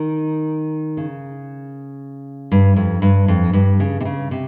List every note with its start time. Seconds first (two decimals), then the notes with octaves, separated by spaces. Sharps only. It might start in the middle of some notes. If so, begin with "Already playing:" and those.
Already playing: D#3
0.97 C#3
2.52 G2
2.76 F2
3.02 G2
3.28 F2
3.53 G2
3.80 C#3
4.00 C3
4.05 C#3
4.31 C3